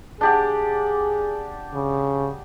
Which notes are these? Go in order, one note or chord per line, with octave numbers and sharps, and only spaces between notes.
D4 G4 G#4 F#5
C#3